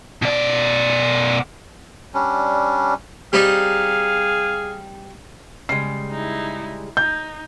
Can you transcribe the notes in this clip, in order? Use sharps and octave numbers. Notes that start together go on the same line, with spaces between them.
B2 D5
G3 C#4 D4
G3 C4 D#4 G#4 F5
C#3 G3 G#3 C7
D#4 E4
D#4 G6